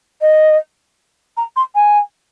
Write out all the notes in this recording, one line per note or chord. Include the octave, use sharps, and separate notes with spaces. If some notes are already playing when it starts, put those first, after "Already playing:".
D#5
A#5
C6
G#5